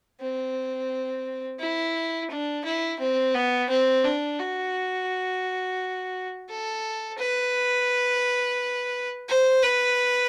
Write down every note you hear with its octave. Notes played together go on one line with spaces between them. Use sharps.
C4
E4
D4
E4
C4
B3
C4
D4
F#4
A4
B4
C5
B4